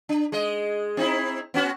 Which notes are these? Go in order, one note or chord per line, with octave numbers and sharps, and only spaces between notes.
D4
G#3 D#5
C4 D#4 E4
B3 C#4 F#4